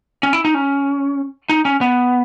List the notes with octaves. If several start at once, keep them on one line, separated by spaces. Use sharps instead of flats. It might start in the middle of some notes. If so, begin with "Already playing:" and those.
C#4
E4
D#4
C#4
D#4
C#4
B3